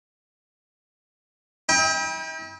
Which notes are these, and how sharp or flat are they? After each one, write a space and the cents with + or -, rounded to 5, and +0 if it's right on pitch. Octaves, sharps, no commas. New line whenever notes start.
E4 -45 G5 +30